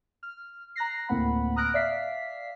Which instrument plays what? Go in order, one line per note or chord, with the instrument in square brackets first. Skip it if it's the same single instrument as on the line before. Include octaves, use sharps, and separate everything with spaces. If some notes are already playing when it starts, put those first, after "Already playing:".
[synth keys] F6
A#5 F#6 A#6 C7
D2 A2 A#3 C4 F#5 B5
A#5 D#6 F6 F#6 A#6 D7
D5 E5 F5 B6 C7